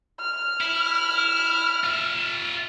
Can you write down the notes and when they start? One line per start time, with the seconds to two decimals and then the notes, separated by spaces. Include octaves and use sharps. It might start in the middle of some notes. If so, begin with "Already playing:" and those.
0.20 F6
0.61 E4
1.84 F4 E5